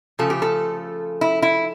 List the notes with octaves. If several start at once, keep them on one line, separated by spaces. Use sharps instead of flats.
C#3 F3 A3 A4
G4
A4
E4
E4